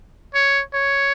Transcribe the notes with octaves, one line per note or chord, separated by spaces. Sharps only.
C#5
C#5